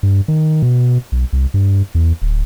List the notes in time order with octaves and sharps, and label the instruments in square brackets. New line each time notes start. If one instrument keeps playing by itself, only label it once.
[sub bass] G2
D#3
B2
B1
C2
G2
E2
D1